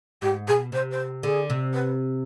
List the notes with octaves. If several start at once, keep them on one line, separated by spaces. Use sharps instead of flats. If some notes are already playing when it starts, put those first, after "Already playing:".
G#2 G4
B2 G#4
C3 C5
C5
D3 G#4
C3
B4